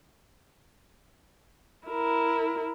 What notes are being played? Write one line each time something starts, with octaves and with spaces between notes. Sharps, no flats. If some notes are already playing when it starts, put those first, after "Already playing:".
E4 A#4